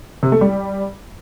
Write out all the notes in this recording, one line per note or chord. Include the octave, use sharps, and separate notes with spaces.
C3
A3
G3